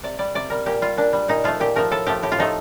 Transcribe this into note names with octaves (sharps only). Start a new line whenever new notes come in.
C3 D5
G3 D5
C3 D5
G3 A#4
A#2 G4
G3 F4
A#2 D4
G3
A#2 D#4
F3 A3 F4
A#2 G4
F3 A3 A#4
A2 A4
F3 A3 G4
A2 G4
F4
F3 A3 D#4